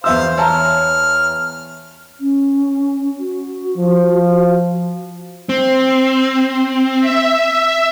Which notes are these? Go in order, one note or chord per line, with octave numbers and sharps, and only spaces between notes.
E2 C5 E5 F5 E6
C#5 A5 A#5 F6
C#4
F#4
F3
C4
E5